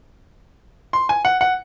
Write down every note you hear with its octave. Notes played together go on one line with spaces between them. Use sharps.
C6
G#5
F#5
F#5